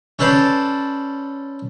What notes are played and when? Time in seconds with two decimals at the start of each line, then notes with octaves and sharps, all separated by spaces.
0.19 C#4 A4 B4 C5 D5 A5